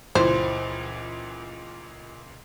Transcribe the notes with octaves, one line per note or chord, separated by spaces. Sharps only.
C#2 A#2 E3 C5